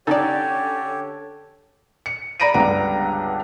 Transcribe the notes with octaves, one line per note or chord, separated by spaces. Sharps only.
D3 C#4 D#4 G4 A4 C#5 D5
C#7
D5 A#5 B5 A#6 D7 D#7
C#2 G2 D3 B3 D4 A#5